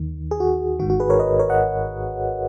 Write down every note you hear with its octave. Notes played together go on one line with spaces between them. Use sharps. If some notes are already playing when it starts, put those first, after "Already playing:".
Already playing: D#2 D#3
G#4
F#4
G#1 G#2 D#3 F#4
F#4
G#4 B4
A#4 C#5
B4 D#5
A#4 C#5
D#5 F#5